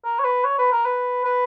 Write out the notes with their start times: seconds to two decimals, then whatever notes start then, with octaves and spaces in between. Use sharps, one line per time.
0.05 A#4
0.19 C#5
0.25 B4
0.45 C#5
0.59 B4
0.72 A#4
0.85 B4
1.25 B4